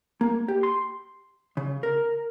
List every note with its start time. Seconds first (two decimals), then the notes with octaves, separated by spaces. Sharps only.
0.21 A#3
0.48 G4
0.63 C6
1.57 C#3
1.83 A#4